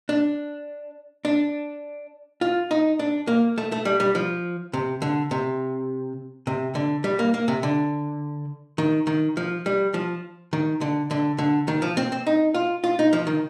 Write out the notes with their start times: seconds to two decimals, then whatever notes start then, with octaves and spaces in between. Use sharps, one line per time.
0.09 D4
1.25 D4
2.41 F4
2.71 D#4
2.99 D4
3.27 A#3
3.58 A3
3.72 A3
3.85 G3
4.00 G3
4.15 F3
4.73 C3
5.02 D3
5.31 C3
6.47 C3
6.75 D3
7.04 G3
7.19 A#3
7.34 A#3
7.48 C3
7.63 D3
8.78 D#3
9.07 D#3
9.37 F3
9.66 G3
9.94 F3
10.53 D#3
10.81 D3
11.11 D3
11.38 D3
11.68 D#3
11.82 F3
11.97 C4
12.12 C4
12.27 D#4
12.54 F4
12.84 F4
12.99 D#4
13.13 F3
13.27 D#3